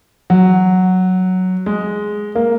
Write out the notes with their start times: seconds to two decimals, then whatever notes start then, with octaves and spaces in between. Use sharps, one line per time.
0.30 F#3
1.66 G#3
2.35 A#3